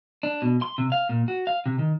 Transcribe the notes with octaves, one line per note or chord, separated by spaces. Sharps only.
D4
B2
C6
C3
F5
A#2
F#4
F5
C3
D#3